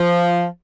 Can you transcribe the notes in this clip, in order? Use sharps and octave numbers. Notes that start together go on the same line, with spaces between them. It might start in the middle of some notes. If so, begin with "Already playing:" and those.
Already playing: F3